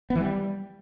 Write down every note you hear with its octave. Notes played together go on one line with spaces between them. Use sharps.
B3
E3
G3